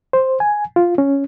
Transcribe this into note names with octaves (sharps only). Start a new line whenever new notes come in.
C5
G#5
F4
C#4